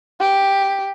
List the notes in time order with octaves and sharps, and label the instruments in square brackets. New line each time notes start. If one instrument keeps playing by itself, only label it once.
[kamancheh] G4